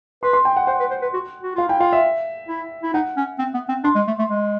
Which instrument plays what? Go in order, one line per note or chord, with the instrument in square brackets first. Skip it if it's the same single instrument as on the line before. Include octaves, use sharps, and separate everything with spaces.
[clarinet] B4 [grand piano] C6
[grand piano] C6
G5
F#5
[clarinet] C5 [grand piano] F#5
[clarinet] B4
C5
B4
F#4
F#4
[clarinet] F4 [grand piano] F5
[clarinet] E4 [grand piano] G5
[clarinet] F4 [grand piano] F5
[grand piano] E5
[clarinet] E4
E4
[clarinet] D#4 [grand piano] F#5
[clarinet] C#4
C4
B3
C4
[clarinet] D4 [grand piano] C6
[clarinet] G#3
A3
A3
G#3